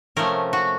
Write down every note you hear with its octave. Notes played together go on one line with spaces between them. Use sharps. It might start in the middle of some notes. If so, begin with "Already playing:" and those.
C3 F3 A3 C#4 A#4
F#4